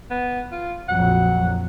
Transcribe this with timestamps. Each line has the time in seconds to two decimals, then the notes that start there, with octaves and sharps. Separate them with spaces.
0.10 B3
0.52 F4
0.88 A#1 F2 F#3 F#5